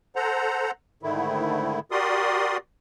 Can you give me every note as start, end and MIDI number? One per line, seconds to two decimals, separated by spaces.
0.16 0.71 69
0.16 0.71 72
0.16 0.71 78
0.16 0.71 82
1.03 1.80 44
1.03 1.80 50
1.03 1.80 51
1.03 1.80 57
1.03 1.80 64
1.91 2.57 66
1.91 2.57 67
1.91 2.57 70
1.91 2.57 74
1.91 2.57 84
1.91 2.57 87